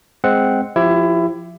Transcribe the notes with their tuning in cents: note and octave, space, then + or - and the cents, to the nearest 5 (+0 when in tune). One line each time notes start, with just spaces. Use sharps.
G#3 +0 C4 -5 F#5 +0
F3 +0 E4 +20 G4 +0